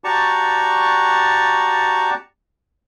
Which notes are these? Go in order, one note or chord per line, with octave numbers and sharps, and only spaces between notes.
F#4 G4 D5 A5 A#5 C#6